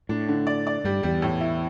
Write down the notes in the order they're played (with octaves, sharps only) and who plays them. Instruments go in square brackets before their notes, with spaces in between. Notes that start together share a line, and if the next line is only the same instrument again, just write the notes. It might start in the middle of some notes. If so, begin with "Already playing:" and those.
[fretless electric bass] A2 [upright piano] D4
[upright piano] D3
D5
D5
[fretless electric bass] G2 [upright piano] G3
[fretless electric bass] E2 [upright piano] G3
[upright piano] A2
E4